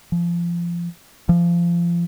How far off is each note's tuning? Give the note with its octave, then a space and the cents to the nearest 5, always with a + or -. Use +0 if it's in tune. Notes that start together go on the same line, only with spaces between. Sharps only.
F3 -25
F3 -25